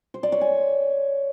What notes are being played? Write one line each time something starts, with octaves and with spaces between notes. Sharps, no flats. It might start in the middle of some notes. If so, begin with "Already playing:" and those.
C5
D5
C#5
G#5